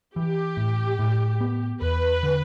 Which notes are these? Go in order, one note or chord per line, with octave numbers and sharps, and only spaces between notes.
E3 G4
A2
A2
B3
E2 B4
D3